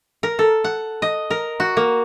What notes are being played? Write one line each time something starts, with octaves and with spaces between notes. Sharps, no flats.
A#4
A4
F#5
D#5
A#4
F#4
A#3